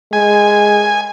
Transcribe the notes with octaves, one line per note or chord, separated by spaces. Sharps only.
G#3 G#5